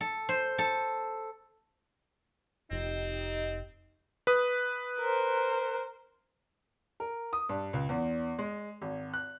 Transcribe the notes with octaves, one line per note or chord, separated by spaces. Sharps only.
A4
C5
A4
F1 C4 D#4 G4 D#5
B4 D#6
A#4 C5
A#4
D#6
G2
C#2
E2
G#3
G#1
F#6